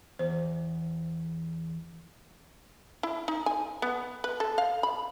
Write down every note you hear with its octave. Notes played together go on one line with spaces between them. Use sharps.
E2 C5
E4
D#4
G#5
B3
B4
A4
F5
B5